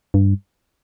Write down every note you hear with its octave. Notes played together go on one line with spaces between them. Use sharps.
G2